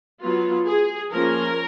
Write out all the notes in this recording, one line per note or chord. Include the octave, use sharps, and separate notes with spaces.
F#3 B3 F4
G#4
F3 A#3 C#4 A#4